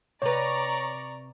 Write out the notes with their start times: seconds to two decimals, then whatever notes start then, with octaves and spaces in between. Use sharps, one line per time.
0.22 C3 B4 C#5 D5 A#5 C#6